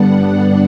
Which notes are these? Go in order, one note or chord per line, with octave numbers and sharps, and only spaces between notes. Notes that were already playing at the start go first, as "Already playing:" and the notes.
Already playing: G2 D3 G3 B3 D4 F#5